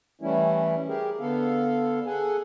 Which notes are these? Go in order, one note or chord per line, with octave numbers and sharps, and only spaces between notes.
E3 G3 A3 C#4 E4
G4 G#4 A#4
D3 B3 A4 F5
G#4 A4 F#5 G#5